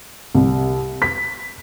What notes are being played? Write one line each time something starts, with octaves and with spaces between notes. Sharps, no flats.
C2
B6